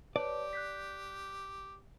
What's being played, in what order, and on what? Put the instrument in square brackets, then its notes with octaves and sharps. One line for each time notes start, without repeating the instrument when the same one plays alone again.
[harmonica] G4 [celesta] B4 C#5 A5 [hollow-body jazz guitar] D5
[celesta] F#6 G6 B6